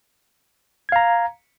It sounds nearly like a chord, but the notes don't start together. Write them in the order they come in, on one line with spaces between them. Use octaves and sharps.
G#6 F5 A#5